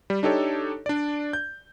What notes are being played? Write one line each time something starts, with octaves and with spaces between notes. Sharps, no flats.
G3
D4 D#4 G4 A4 C#5
D4 D5
G6